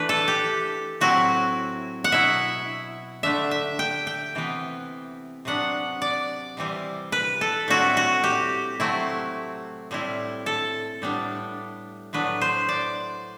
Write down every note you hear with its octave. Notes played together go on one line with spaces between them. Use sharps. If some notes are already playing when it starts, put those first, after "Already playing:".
Already playing: E3 A3 D4 B4
A4
G4
A2 F#3 C4 E4 F#4
F#5
B2 F#3 B3 E4 E5
D3 A3 D4 E5
E5
G5
G5
C3 E3 B3
C3 F#3 B3 D4 F#5
D5
C3 E3 G3 C4
B4
A4
A2 G3 C4 E4 F#4
F#4
G4
C3 F#3 A3 C4 E4
A2 G3 C4 E4
A4
A2 G3 B3 D4
A2 F#3 B3 D4 B4
C5
D5